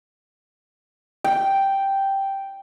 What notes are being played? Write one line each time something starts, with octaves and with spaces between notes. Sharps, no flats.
G5